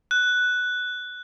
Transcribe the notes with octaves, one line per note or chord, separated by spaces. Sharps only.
F#6